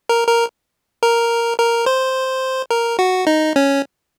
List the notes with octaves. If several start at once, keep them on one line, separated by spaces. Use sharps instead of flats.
A#4
A#4
A#4
A#4
C5
A#4
F#4
D#4
C#4